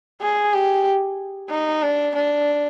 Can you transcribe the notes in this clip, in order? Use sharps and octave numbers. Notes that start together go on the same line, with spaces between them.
G#4
G4
D#4
D4
D4